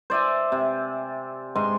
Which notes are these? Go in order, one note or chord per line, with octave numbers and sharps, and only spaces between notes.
C5 D5 E5 G#5
C3
G#2 G#5 C6